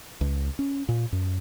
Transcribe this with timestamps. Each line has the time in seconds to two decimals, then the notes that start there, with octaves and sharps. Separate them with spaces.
0.21 C#2
0.59 C#4
0.89 A#2
1.12 F#2